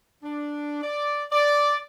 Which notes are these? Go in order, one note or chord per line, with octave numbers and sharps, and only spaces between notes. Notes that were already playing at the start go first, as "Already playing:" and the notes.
D4
D5
D5